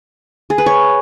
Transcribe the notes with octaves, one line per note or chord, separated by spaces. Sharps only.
G#4
B4
C#5